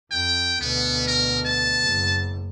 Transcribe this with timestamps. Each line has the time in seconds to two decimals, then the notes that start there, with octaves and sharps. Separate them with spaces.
0.12 F2 G5
0.61 D2 B2 B3
1.08 A#4
1.46 A5
1.81 F#1